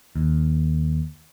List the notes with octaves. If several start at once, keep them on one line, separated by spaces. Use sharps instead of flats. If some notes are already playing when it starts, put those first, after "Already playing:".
D#2